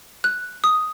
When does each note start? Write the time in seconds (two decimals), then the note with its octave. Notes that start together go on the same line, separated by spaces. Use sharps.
0.24 F#6
0.64 D#6